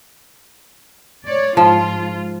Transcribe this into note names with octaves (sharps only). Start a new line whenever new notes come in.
C#5 D5
G#2 F3 F4